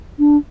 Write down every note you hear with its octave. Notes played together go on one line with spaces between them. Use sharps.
D4